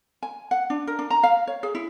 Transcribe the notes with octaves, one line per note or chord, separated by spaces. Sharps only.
G#5
F#5
D4
A#4
D4
A#5
F5
C#5
G#4
E4